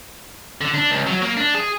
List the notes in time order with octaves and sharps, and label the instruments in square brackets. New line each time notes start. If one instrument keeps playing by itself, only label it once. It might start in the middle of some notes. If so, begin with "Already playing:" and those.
[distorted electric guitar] D3
D4
C#2
F#3
A#3
D4
G#4